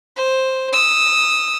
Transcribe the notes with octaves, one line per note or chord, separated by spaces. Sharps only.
C5
D#6 E6